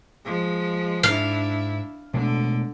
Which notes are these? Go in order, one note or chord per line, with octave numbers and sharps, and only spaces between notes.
F3 G#3
G#2 D4 E4 F5
B2 D3 G#3 A3